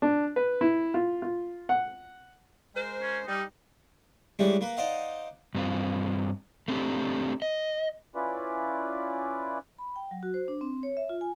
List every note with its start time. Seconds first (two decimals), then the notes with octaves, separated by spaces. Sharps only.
0.02 D4
0.36 B4
0.61 E4
0.94 F4
1.22 F4
1.69 F#5
2.75 G#3 A#4 C5
3.02 C#4
3.26 G3 D#4
4.39 E3 G3 G#3 C#4 D4 G4
4.61 A#3 A#4 B4
4.77 D#4 C5 D5 D#5 F5 F#5
5.55 G2 C4 F4
6.68 A3 C4 D4 G4
7.42 D#5
8.15 C#4 E4 F4 B4 D5
9.79 B5
9.96 G5
10.11 F#3
10.23 F#4
10.34 C5
10.48 D4
10.61 C4
10.83 C#5
10.97 E5
11.09 F4
11.21 G#5